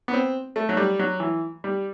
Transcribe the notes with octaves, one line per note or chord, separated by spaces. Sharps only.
B3
C4
A3
F#3
G3
F#3
E3
G3